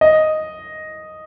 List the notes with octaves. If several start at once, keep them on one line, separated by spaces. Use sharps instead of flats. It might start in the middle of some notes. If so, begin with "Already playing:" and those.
D#5